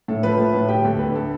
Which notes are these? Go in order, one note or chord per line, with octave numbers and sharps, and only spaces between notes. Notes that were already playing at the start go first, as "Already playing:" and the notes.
A2 A4
F3 B4
A3
A2
D3 G4 G5
D2 A4
D3 B4
A3 A4